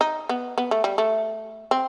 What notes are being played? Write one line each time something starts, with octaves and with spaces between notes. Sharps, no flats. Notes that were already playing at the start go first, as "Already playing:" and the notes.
D#4
B3
B3
A3
G3
A3
C4